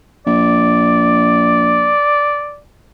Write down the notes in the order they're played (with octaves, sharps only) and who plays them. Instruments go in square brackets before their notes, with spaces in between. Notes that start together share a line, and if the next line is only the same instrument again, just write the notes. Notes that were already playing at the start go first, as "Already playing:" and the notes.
[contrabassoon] A#1 [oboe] D5